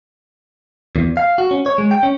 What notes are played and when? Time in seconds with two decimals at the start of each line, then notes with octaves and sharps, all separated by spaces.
0.96 E2
1.17 F5
1.38 F#4
1.51 C#4
1.66 C#5
1.78 G#3
1.91 G5
2.03 C#4